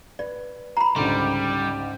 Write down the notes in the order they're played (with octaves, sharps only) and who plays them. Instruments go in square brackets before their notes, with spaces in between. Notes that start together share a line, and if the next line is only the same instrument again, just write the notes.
[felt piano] B4 [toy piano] D5
[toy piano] A#5 B5
[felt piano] C#2 G#2 D3 [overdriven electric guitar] G3 [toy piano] C6